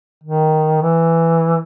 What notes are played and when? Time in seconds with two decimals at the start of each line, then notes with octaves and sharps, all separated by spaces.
0.24 D#3
0.82 E3